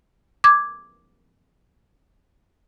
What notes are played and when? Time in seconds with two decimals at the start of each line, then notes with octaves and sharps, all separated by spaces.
0.44 D6 G#6